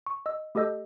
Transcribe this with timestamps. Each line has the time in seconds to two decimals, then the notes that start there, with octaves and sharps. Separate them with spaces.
0.06 C#6
0.26 D#5 E6
0.55 A3 G4 A4 D#5 E6 G6